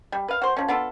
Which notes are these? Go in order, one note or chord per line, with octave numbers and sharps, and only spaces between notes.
G3
B4 F5
F#4 C5
F3 C#4
B3 D4 F4 A4